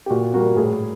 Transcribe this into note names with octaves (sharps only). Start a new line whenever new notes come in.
G4
A#2 F#4
G3 A#3 F#4
A2 G#4